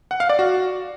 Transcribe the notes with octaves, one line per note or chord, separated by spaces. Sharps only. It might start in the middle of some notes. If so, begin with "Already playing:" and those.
F#5
F5
D5
F#4